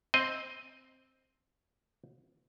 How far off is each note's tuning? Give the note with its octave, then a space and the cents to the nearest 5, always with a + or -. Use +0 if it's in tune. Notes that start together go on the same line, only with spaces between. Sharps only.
C4 +0 D#5 +0